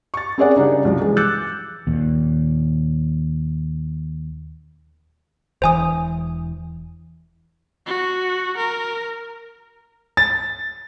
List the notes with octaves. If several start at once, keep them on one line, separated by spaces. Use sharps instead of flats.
C#6 A6
C4 C#4 G#4 A#4 D5 F#5
C#3 G3 D4 D#4
C2 F3 F#3
E3 G#3
D6 E6 F#6 G6 A6 C#7
D#2 A#2
E1 E3 C5 G#5 D#6
F#4
A#4
A6